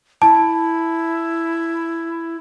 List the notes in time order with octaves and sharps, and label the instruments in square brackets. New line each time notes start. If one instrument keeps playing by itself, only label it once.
[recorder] E4 [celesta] A5